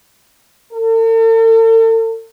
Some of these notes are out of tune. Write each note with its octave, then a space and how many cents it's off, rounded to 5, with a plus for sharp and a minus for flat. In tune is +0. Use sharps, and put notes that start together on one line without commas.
A4 +45